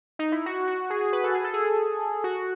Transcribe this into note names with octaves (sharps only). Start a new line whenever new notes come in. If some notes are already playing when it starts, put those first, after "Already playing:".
D#4
E4
F#4
F#4
G#4
G#4
B4
A4
G#4
A4
G#4
F#4